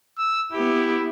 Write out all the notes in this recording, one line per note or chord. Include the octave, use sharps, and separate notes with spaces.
E6
B3 E4 G4